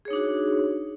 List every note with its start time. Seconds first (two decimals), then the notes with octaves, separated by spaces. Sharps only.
0.05 G#4
0.08 C#5
0.10 D#4
0.13 D4
0.16 F#4